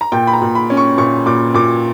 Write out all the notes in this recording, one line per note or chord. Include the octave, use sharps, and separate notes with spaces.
A#5
A#2 G5
B5
A#5
A#2
B5
C#4
C#6
A#2 C#6
A#2 D6
A#2 D6